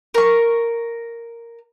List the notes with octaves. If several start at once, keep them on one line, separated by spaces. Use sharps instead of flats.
A#4 C#6